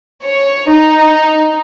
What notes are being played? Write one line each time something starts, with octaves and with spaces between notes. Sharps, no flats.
C#5
D#4